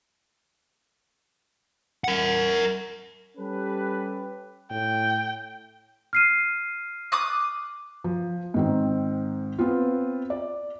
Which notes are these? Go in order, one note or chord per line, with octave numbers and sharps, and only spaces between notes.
A#4 F#5
G3 C#4 G4 A4 B4
A2 G5
F6 C7 D#7
D6 D#6 F#6
F3
G#2 D#3 C4
B3 C4 F4
D5